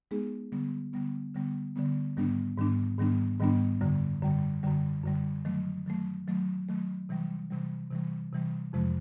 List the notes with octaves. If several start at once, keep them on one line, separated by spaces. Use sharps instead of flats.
G#3 B3 D#4 G#4
D3 G3 B3
D3 G3 B3
D3 G3 B3
D3 G3 B3
G#2 D#3 G3 B3 D4
G#2 D#3 G3 B3 D4
G#2 D#3 G3 B3 D4
G#2 D#3 G3 B3 D4
F#2 D3 G3
F#2 D3 G3
F#2 D3 G3
F#2 D3 G3
D#3 F#3 A3
D#3 F#3 A3
D#3 F#3 A3
D#3 F#3 A3
C3 E3 G3
C3 E3 G3
C3 E3 G3
C3 E3 G3
F2 C3 F3 G#3